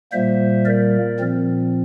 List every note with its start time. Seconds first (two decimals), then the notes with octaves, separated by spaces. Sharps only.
0.12 A#2 G3 A#3 C5 E5
0.66 A#4 D5
1.19 A#2 F3 C4